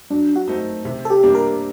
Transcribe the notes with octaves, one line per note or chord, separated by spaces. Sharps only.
F#3 D4
F#4
A3 C4 D#4
C3
A4
G4
G3 A#3 D4
A#4